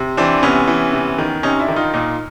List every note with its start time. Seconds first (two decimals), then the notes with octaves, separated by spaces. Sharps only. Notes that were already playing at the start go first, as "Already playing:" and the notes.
Already playing: C3
0.17 E3 C4 D4
0.43 C3 B3 C#4
0.68 E3
0.93 C3
1.18 D#3
1.43 C3 C#4 D#4
1.60 D4 E4
1.68 D#3
1.76 D#4 F4
1.93 A#2 D#4 F4